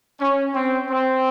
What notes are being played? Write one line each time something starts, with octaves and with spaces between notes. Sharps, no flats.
C#4
C4
C4